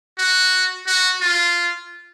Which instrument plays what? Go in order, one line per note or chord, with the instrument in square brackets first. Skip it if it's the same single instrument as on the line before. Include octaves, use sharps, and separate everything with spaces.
[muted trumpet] F#4
F#4
F4